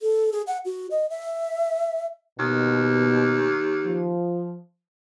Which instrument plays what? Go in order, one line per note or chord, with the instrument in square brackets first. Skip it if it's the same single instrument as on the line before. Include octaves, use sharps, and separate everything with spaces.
[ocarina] A4
G#4
F#5
F#4
D#5
E5
[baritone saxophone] D#2 [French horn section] B2
[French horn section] F3